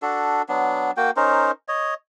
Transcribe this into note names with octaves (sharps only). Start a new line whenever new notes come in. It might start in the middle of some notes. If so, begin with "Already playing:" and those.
D4 F#4 A4
F#3 B3 D4
A#3 F#4 G5
C#4 D#4 A#4 C5
C#5 D#5